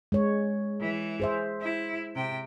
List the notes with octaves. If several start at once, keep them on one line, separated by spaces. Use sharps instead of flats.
G#3 C#5
E3
G#4 C5 E5
E4
C3 G5